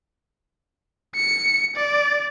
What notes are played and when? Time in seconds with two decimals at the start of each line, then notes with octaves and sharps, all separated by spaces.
1.16 C#7
1.76 D5